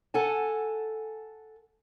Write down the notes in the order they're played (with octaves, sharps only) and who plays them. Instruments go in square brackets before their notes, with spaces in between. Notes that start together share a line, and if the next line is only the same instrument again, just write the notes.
[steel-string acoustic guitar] A4 F#5 G#5 A5